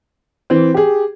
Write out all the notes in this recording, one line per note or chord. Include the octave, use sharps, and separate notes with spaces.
E3 C4
G4 G#4